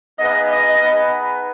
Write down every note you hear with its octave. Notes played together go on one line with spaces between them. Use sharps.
B3 D#4 G#4 B4 D#5 F5
D#5
B3 D#4 G#4 B4